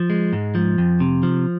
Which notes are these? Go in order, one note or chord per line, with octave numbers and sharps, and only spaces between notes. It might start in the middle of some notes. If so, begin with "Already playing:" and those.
Already playing: F3
G#3
G#2
F3
F2
C3
F3